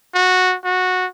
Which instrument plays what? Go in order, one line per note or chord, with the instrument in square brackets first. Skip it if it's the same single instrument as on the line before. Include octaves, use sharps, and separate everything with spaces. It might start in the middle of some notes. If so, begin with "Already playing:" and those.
[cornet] F#4
F#4